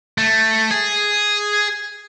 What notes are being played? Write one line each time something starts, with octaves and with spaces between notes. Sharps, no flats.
A3
G#4